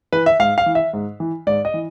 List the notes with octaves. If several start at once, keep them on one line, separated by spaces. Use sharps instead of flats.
E3 B4
E5
G#2 F5
F5
E3
E5
G#2
E3
G#2 D5
D#5
E3